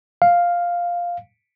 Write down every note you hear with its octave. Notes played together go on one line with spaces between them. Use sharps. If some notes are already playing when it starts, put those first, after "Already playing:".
F5